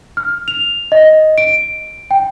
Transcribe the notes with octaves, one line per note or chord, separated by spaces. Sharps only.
F6
F7
D#5
D7
G5